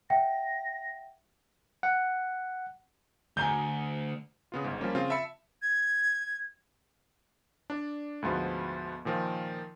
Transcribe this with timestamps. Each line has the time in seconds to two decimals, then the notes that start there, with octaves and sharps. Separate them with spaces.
0.10 E5 F#5 G5 A#6
1.83 F#5
3.37 D2 G#5 A#5 G6
4.52 C#3 B3 F4
4.64 G1 G#2
4.80 F3 G3 A#3 C#4
4.95 C#3 C4 F4
5.10 E5 A5 B5 E6 C#7
5.62 G#6
7.70 D4 D5
8.22 D2 G#2 F3 B3 F#4
9.05 A#2 D#3 F3 A#4